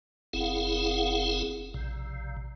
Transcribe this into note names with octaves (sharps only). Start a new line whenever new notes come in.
F#1 C4 E4 G#4 F5 F#5
A#1 C3